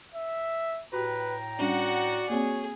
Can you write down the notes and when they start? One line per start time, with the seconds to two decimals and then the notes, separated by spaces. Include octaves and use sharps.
0.15 E5
0.93 A2 F#4 G4 B4 G5 A#5
1.59 G3 C#4 D4 F#4 D5 F#5
2.30 A#3 C4 F#4 G#4 C#5